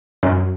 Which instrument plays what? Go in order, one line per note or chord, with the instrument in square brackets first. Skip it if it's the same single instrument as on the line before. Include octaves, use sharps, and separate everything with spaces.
[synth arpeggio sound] F#2